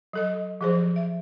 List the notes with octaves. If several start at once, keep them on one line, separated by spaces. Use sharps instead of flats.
F#3 A4 D#5
F3 G#4 C5
E5